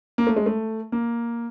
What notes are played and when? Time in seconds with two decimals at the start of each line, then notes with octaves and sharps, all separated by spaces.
0.18 A#3
0.27 A3
0.36 G#3
0.46 A3
0.92 A#3